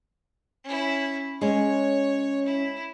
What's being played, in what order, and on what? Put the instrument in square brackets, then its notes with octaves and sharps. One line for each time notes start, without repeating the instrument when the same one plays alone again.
[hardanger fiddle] C#4 E4
[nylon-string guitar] G#3 [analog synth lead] C#4 [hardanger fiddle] C#5
[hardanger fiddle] E4